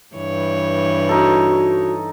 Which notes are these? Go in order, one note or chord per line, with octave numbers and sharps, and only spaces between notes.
G2 E3 C#5
D#4 F#4 A4